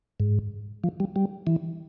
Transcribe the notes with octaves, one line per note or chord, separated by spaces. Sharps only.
G#2
F3
G3
G3
E3